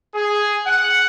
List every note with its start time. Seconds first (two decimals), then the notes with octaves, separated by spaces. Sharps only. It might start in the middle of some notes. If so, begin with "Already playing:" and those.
0.14 G#4
0.66 F#5